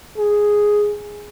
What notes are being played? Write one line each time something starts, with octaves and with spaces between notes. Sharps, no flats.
G#4